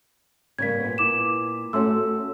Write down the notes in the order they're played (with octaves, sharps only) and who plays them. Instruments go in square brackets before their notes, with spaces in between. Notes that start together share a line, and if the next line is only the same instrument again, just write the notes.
[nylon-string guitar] C#3 G3 A#3 [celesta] G#6 B6
[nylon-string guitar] A#2 B3
[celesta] E4 D6 E7
[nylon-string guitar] A3 C#4 F#4 [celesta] C6 E6